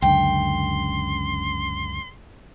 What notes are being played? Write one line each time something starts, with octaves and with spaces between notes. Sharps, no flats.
C#2 F#2 D3 G5 C6